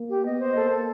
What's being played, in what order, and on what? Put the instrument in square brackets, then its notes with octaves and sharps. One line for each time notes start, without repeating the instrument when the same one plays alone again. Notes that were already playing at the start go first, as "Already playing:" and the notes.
Already playing: [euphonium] A#3
[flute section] G4
[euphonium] B3 [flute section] D#5
[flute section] C5
[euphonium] A#3 [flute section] A4
[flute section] A4